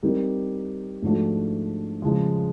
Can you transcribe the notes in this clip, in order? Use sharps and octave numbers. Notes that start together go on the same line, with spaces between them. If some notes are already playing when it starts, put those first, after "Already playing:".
G3 C4 D#4 G4 A#4
G#2 F3 A3 D4 F#4
C#3 F3 G#3